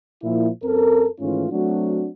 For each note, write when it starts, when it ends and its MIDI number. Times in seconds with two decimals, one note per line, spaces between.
0.24 0.49 46
0.24 0.49 53
0.24 0.49 64
0.64 1.06 42
0.64 1.06 60
0.64 1.06 69
0.64 1.06 70
1.20 1.46 44
1.20 1.46 51
1.20 1.46 52
1.20 1.46 57
1.20 1.46 61
1.20 1.46 65
1.51 2.07 54
1.51 2.07 57
1.51 2.07 60
1.51 2.07 62
1.51 2.07 66